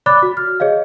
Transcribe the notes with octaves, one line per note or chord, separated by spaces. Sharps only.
C#5 D5 B5 D6 F#6 A6
F#4
F6
G#4 C#5 D#5 F5